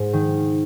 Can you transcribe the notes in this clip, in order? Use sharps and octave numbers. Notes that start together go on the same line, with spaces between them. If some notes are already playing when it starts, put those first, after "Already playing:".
Already playing: G#2
D#3